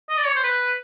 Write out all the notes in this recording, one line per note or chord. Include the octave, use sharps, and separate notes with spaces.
D#5
D5
C#5
C5
B4